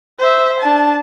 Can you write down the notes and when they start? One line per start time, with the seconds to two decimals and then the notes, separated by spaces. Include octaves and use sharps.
0.19 C5 E5
0.60 D4 A5